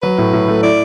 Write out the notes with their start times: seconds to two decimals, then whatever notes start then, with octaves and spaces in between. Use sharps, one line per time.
0.02 F#3 B4
0.18 A2
0.33 A2
0.48 A3
0.63 E4 D5